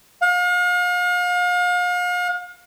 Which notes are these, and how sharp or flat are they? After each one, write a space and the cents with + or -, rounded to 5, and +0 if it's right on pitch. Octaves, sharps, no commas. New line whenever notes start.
F5 +40